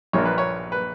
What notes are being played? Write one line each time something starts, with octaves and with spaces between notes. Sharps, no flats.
A#1 A#2 A#3 D4 C#5
B4
C#5
B4